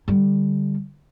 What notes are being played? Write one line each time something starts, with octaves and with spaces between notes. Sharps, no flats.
D3 G3